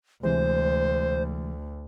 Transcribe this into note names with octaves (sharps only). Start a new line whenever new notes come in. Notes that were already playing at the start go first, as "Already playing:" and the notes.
D2 C3 E3 G#3 C5